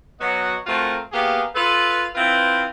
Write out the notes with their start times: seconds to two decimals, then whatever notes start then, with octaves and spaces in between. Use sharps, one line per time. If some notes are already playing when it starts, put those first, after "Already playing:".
0.20 F#3 B3 F#4 D#5 F#5
0.67 A3 C4 F4 F#4 A#4
1.12 A#3 B3 G4 G#4 F5
1.54 F4 A4 B4
2.15 C4 E4 F4 B4